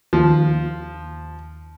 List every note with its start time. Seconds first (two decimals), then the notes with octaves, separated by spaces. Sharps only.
0.13 D#2 F3